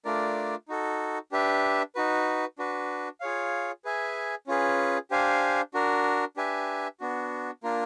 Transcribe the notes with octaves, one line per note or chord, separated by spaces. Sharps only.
A3 D4 F4 A#4 D5
D#4 F#4 A4
D4 G4 B4 E5
D#4 F#4 B4
D4 F#4 B4
F4 G#4 C#5 F5
G#4 B4 E5 G#5
C#4 F4 G#4 B4
D4 G4 C5 F5 G#5
D4 F#4 A#4
D4 G4 B4 E5 G#5
B3 D4 F#4
A#3 D4 F4 A#4